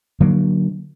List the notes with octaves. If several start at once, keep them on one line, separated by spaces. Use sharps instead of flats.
D3 F#3 A#3